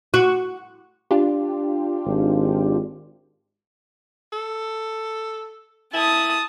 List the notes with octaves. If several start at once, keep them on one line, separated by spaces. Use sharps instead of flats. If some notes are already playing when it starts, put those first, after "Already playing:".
F#4
D4 F4 G4
G#1
A4
E4 A5 D#6